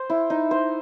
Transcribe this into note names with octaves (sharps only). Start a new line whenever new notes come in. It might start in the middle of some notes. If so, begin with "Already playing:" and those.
Already playing: C5
E4
D#4
C5